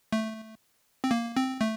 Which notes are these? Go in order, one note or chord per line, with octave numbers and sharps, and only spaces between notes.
A3
C4
A#3
C4
A3